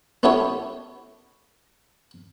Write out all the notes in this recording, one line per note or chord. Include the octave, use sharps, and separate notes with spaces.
B3 C#4 E4 G4 A4 C#5